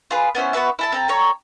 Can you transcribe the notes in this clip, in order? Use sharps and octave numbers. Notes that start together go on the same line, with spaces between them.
F4 G#4 B4
B3 C#4 E4 C5
B3 F#4 B4 E5
E4 A4 A5
C4 A4 A#5
A4 C#5 A#5